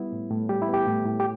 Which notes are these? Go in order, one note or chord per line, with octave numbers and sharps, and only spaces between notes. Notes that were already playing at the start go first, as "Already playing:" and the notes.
Already playing: G3 B3 E4
A2
A2
G3 G4
E4
B3
G4
A2
A2
G4